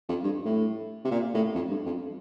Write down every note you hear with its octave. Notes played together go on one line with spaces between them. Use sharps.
F2
G2
A2
C3
A#2
A2
F2
G2
F2